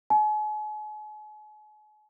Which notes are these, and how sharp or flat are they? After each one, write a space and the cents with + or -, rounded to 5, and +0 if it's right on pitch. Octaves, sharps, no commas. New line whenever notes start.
G#5 +40